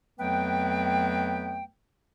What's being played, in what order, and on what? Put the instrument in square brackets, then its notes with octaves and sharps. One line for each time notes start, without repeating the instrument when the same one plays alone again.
[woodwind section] F2 F#3 A3 B3 B4 G5